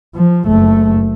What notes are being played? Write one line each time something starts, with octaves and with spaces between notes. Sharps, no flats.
F3
F#1 A3